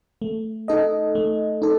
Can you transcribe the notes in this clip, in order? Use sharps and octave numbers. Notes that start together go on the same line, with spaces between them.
A3
D#4 A4 D#5
A3
D#4 A4